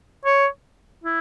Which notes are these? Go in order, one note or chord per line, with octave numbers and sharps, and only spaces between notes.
C#5
E4